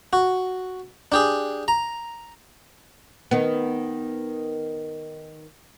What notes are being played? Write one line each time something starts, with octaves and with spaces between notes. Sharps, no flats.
F#4
D4 G4 G#4
A#5
D#3 B3